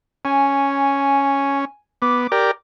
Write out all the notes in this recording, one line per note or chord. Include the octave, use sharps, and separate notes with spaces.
C#4 G#5
B3 D6
G4 A#4 D5